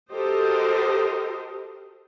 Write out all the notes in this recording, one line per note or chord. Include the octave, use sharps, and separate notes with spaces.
F#4 G4 A4 A#4 C5 D#5